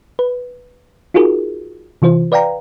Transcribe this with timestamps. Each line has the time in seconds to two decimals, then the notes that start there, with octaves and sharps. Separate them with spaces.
0.19 B4
1.14 D#4 F4 F#4 G#4 A#4
2.02 C3 E3 F4 C5
2.32 B4 D5 F5 G5 A#5